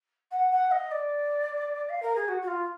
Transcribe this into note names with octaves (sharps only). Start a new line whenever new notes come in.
F#5
F#5
D#5
D5
F5
A#4
G#4
F#4
F#4
F4